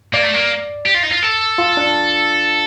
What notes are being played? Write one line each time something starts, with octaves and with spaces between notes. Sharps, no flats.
A#3 D5
A3
A#3
G4
F4
D#4
F4
A4
F4
D4